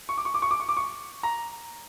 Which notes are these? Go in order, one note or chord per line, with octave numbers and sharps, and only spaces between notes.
C#6
D6
C#6
D6
C#6
D6
C#6
D6
C#6
A#5